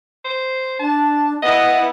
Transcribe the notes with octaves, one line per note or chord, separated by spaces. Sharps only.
C5
D4 A5
B3 E4 D#5 F#5